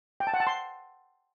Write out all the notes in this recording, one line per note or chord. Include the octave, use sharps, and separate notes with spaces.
G5
A5
F#5
A5
C6